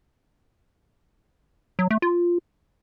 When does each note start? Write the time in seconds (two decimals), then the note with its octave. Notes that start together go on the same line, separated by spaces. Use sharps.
1.79 F#3
1.91 A3
2.02 F4